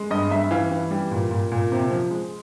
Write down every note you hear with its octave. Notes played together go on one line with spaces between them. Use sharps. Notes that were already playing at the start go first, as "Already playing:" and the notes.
Already playing: G#3
G2 D#5
G2 E5
E3 F5
E3
G3
A#2
A#2
A#2
C3
F3
G#3